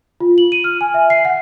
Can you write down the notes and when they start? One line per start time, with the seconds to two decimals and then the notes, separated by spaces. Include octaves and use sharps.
0.20 F4
0.38 F#7
0.52 D#7
0.64 F6
0.81 G#5
0.94 E5
1.10 C7
1.25 F#5